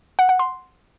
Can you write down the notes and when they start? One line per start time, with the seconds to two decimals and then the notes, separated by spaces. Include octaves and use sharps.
0.19 F#5
0.29 F#5
0.39 C6